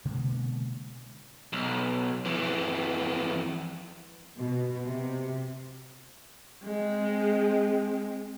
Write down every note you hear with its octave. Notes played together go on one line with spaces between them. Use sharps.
B2 D3 G#3 A#3
B1
F2 E3
B2
C3
G#3 C4